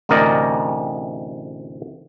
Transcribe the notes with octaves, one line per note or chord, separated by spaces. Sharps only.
A1 D2 C3 A#4 D5 D#5